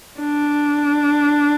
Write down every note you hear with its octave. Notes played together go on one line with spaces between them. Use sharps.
D4